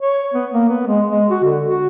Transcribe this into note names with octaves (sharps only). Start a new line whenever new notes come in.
C#5
B3
A#3
B3
G#3
G#3
F#4
D3
F#4